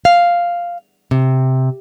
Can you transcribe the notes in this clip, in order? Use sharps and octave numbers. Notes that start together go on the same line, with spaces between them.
F5
C3